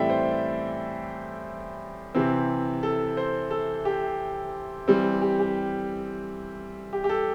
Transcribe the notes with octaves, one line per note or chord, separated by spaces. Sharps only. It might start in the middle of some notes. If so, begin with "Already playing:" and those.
Already playing: A2 E3 G3 C4 A4 D5 E5 G5
C5
C3 E3 C4
A4
C5
A4
G4
E3 G3 C4
G4
G4
G4
G4
A4